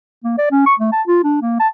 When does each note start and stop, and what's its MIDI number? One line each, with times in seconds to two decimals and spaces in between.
0.24 0.33 58
0.38 0.46 74
0.51 0.64 61
0.66 0.74 85
0.79 0.92 57
0.92 1.02 81
1.07 1.23 65
1.24 1.38 62
1.42 1.57 58
1.60 1.68 81